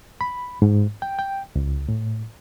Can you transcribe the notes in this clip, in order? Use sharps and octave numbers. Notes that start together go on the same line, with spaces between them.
B5
G#2
G5
G5
C#2
A2